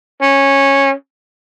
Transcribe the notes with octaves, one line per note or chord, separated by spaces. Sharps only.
C#4